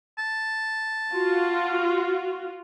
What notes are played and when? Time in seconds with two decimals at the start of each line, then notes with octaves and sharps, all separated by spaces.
0.18 A5
1.12 F4 F#4